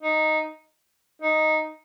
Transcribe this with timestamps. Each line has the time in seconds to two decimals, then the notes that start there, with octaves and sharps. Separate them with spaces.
0.03 D#4
1.22 D#4